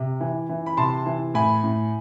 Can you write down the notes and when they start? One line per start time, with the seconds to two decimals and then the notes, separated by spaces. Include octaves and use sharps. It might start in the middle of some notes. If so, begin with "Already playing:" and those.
Already playing: C3
0.21 E3
0.49 E3
0.66 B5
0.77 C3 A5 C6
1.06 E3
1.34 A2 G#5 B5
1.64 A2